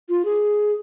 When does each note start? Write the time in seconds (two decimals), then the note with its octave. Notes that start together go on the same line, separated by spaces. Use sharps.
0.09 F4
0.25 G#4